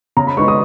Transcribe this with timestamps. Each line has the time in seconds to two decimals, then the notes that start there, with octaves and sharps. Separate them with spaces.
0.17 C#3 A#5
0.27 B5
0.37 G#3 B3 D#4 C#6
0.48 D#6